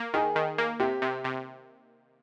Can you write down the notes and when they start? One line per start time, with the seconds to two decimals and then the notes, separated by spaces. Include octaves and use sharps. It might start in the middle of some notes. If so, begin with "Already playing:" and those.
Already playing: A#3
0.14 D#3 G#4
0.36 D#3
0.58 A#3
0.80 C3 G4
1.02 C3
1.24 C3